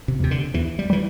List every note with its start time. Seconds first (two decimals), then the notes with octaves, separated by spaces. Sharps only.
0.08 C3
0.20 E2 C3
0.31 D3
0.54 E2 E3
0.79 G3
0.90 E3 G3